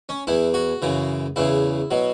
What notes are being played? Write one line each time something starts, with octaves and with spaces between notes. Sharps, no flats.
C#4
E2 E3 E4
F#4
F#2 C#3 E3
E2 C#3 E3 E4
B2 F#3